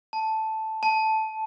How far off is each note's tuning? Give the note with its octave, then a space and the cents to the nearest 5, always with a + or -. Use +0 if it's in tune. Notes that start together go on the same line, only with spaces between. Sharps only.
A5 +0
A5 -5